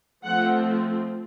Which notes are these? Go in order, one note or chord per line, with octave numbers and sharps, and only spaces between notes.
F3 A3 C4 F#5